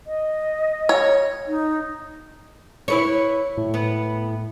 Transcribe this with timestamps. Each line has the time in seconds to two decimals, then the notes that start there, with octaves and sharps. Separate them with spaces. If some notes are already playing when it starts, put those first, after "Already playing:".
0.07 D#5
0.89 C#5
1.47 D#4
2.88 E4 B4 C#5
3.57 A2
3.74 B3